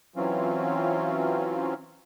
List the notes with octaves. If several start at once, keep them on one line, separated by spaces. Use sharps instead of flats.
E3 F#3 C4 C#4 F4